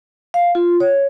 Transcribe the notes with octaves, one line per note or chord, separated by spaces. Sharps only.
F5
F4
C#5